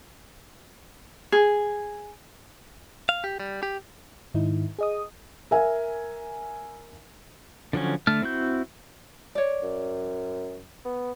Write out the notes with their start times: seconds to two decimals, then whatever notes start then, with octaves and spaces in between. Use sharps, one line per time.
1.32 G#4
3.09 F5
3.24 G4
3.40 G3
3.63 G4
4.34 G#2 D#3 D#4 E4
4.79 G#4 D#5 D#6
5.51 A#4 E5 G#5
7.73 D3 F3 F#3 C#4
8.07 D3 A3 A5 F6
8.22 C4 E4 F#4 G6
9.35 C#5 D5
9.63 F#2
10.85 B3